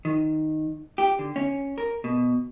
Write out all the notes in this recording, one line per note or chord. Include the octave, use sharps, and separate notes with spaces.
D#3
G4
D3
C#4
A#4
B2